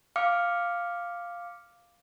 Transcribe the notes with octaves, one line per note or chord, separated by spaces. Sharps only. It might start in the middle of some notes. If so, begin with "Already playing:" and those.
F5 D6 F6 C#7